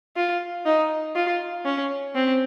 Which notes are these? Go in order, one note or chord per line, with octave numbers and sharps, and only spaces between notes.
F4
D#4
F4
C#4
C4